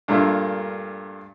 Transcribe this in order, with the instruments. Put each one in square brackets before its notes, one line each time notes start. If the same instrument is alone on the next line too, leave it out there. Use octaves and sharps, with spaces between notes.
[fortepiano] G2 A#2 A3 A#3